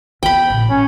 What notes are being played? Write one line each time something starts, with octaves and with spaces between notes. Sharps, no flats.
E3 B3 G5 B5
A1 A#2
C#4